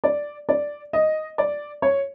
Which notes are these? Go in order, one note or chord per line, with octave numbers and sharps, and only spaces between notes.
D5
D5
D#5
D5
C#5